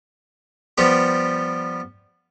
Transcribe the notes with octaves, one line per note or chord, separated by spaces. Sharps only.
F3 G3 B3 G4